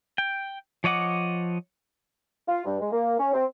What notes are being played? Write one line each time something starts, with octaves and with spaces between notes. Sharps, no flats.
G5
F3 C#5 D#5 F#5 D6
F4
G2
G#3
A#3
C#4
C4